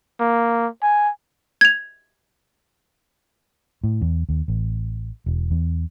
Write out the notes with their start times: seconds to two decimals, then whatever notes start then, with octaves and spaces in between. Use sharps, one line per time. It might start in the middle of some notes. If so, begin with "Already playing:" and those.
0.20 A#3
0.82 G#5
1.61 G#6 F7
3.84 A2
4.01 E2
4.29 D#2
4.48 A1
5.26 E1
5.51 E2